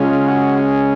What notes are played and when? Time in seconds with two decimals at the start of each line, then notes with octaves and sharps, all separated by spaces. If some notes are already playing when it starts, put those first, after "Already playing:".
Already playing: C#3 G#3 C#4 F4
0.28 F#4